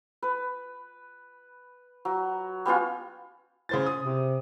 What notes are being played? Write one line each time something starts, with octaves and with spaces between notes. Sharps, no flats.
B4
F#3
G3 B3 C#4 F4
C#3 C5 A6
D#6
C3